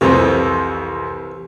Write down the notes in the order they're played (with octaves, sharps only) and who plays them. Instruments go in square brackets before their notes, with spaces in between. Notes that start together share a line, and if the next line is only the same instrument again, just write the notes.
[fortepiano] C2 F2 [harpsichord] C3 E3